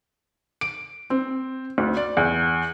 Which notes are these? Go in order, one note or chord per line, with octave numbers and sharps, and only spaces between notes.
D7
C4
D2
D5
E2